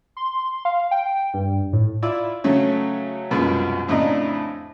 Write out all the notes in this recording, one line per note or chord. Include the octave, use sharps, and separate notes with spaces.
C6
F5
G5
G2
A2
E4 F4 D5 E6
C#3 F#3 A3 C#4
C2 F#2 B2 F3 G#3
F2 A2 C#3 D4 D#5 A#5